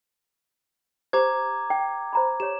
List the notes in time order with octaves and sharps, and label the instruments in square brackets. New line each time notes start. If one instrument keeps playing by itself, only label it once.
[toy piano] G4 C5 [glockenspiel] A#5 D6 G#6
[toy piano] G5
C5 A#5 B5
[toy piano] G4 C#5 [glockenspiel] E7